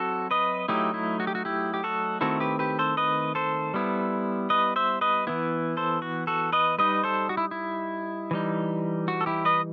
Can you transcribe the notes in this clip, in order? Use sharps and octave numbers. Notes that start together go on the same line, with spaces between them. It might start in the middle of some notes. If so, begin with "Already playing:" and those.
Already playing: F#3 C4 E4 F#4 A4
B4 D#5
F#3 A3 D#4 E4 G4
E4
F#4
G4
F#4
E4 G4
G4
F#4 A4
D#3 A3 C4 E4 F#4 A4
G4 B4
G4 B4
A4 C5
B4 D#5
A4 C5
G3 B3 E4
B4 D#5
C5 E5
B4 D#5
E3 B3 E4
A4 C5
F#4
F#4 A4
B4 D#5
G3 D#4 B4 D#5
A4 C5
F#4
E4
E4
E3 G3 D#4
F#4
A4
E4 G4
B4 D#5